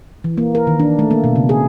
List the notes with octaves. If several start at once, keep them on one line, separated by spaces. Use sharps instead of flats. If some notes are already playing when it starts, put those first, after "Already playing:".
E3
A#3
A#4
D#3
D4
A3
A#3
B2
C#3
G#4